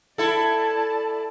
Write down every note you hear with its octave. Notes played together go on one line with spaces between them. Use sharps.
E4 A4 D5 A5